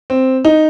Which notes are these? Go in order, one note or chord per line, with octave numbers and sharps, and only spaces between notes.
C4
D#4